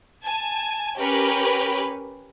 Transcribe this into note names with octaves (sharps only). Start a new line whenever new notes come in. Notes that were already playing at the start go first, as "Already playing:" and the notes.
G#5 A5
C#4 G4 A#4 B4